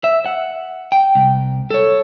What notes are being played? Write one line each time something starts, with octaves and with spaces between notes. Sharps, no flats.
E5
F#5
G5
C2
A4 C#5